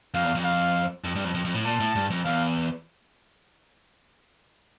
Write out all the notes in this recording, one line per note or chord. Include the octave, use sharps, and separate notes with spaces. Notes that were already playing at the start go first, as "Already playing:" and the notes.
F2 F5
E2
F2
F5
F2
G2
F2
F2
F2
A2
A#2 A5
A2
G2
F2
E2 F5